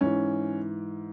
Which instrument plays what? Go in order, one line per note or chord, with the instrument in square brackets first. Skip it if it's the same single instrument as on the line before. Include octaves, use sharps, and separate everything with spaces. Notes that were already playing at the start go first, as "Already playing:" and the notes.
[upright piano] G#2 E3 C#4